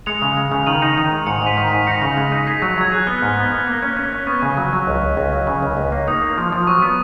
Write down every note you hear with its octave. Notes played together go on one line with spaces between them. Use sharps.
G#3 C#7 F7
C#3
G#3
C#3
D#3 D#7 F#7
D#4
D#3
G#3
G#2 C#7 F7
G#2 B6 D#7
D#3
G#2 B6 D#7
D#4 A#6 C#7
C#3
G#3
D#4
G#4 B6
F#3
F#3 G#6
G#4 F#6
B3 F6
G#2
B3
B3
A#3
C#4
C#4
C#4
B3 C#6
C#3
F#3
F#3
C#2
C#2
C#2
F#3
C#3
C#2
C#2
A#3
D#4 D#6
A#3
F3
F3
F#3 C#6
B3